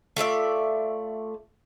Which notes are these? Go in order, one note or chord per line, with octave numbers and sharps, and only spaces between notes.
A3 F4 D5 E5